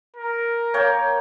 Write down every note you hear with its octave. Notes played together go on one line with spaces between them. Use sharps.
A#4
A#3 C#5 G5